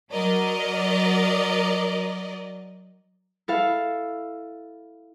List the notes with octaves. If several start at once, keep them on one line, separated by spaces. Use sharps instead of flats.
F#3 A#4 D5 D#5
E4 A4 F5